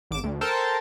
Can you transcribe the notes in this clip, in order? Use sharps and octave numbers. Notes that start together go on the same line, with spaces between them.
G#1 D6 D7 E7
D2
A4 A#4 C5 G5 A5